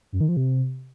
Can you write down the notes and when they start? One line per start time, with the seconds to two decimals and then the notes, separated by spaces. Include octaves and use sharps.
0.12 F#2
0.21 D#3
0.29 F3
0.37 C3